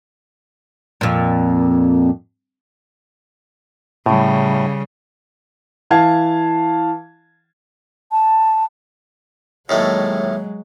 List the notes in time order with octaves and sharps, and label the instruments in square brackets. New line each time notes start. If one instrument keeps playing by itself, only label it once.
[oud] F2 A#2
[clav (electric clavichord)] A2 [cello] C#3 G3
[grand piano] E3 F5 A5 G#6
[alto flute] A5
[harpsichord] D#2 A2 A3 [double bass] F#3 G#3 [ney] C#5